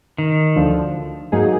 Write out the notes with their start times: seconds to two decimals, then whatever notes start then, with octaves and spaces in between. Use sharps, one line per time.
0.18 D#3
0.56 D2 D3 F3
1.32 G#2 F#3 A#3 D#4 G#4